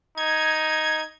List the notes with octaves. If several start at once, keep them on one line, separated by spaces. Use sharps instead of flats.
D#4 G#6